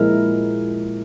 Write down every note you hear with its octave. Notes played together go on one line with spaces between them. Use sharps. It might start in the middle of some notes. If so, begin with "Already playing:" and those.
Already playing: A#2 F3 G#3 E4 A#4